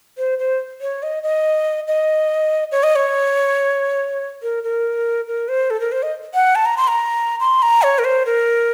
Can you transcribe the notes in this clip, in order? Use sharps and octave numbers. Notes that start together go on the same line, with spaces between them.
C5
C5
C#5
D#5
D#5
D#5
C#5
D#5
C#5
A#4
A#4
A#4
C5
A4
A#4
C5
D#5
F#5
A5
A#5
C6
A#5
C6
A#5
C#5
A#4
C5
A#4